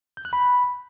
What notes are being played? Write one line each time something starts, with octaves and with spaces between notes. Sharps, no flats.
G6
F#6
B5